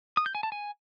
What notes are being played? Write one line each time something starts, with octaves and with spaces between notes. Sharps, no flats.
D#6
G6
G#5
A5
G#5